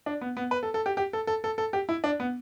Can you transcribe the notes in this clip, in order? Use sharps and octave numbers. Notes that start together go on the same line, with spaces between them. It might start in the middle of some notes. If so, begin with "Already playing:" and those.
D4
B3
B3
B4
A4
A4
G4
G4
A4
A4
A4
A4
G4
E4
D4
B3